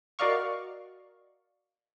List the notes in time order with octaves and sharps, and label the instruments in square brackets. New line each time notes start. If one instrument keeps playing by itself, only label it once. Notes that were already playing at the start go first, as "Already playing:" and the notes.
[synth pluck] F#4 A#4 D5 D#5 F5 C#6